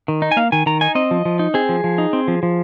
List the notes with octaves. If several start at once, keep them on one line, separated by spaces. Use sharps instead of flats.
D#3
D#4
G#5
A#3 F5
D#3 G#5
D#3 A#5
D#4 G#5
C4 D#5
F3
F3
D#4
C4 G#4
F3
F3
D#4
C4
F3
F3